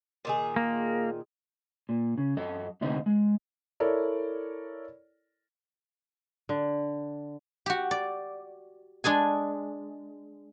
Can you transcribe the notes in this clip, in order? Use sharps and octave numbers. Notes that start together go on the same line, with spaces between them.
A#2 D#3 G#4
A#3
A#2
C#3
F#2 A4 D#5
D2 C3 C4 D#4 D#5
G#3
E4 A4 A#4 C#5 D5
D3
F#4 G4
D5
G#3 D4 G#4 G#5